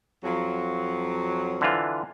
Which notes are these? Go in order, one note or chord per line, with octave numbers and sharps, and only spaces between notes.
F2 F3 F#3
D3 E3 F4